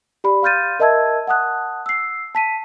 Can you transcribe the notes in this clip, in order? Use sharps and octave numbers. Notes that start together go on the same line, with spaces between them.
G4 D5 B5
F5 C6 F6 G6 A6 D#7
A#4 D#5 E5 A5 E6 G#6
F#5 A5 D#6 F#6
E6 C7
A5 B6 D#7